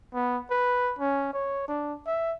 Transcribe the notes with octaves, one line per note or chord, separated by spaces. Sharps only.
B3
B4
C#4
C#5
D4
E5